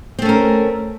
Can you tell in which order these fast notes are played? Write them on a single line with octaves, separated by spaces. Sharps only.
C4 A3 C#4 A#4